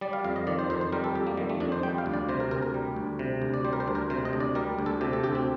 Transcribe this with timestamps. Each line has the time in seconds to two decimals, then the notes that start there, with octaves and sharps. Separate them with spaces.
0.01 G3 D5
0.13 F5
0.24 F2 F5
0.36 D#5
0.47 D#3 D5
0.59 C5
0.70 F2 C5
0.81 C5
0.92 G3 A#4
1.04 A4
1.15 F2 G4
1.27 A#3
1.37 D#3 G3
1.49 A3
1.60 F2 D4
1.72 C5
1.83 G3 G5
1.98 F5
2.06 D2
2.14 D5
2.29 C3 C5
2.40 A#4
2.51 D2 A#4
2.63 A#4
2.74 G3
2.96 D2
3.19 C3
3.42 D2
3.54 D5
3.65 G3 C5
3.73 A#4
3.80 C5
3.88 D2
3.95 A#4
4.10 C3 C5
4.25 D#5
4.33 D2
4.40 D5
4.55 G3 A#4
4.79 D2
4.86 A4
5.01 C3 G4
5.13 A4
5.23 D2 G4
5.35 C4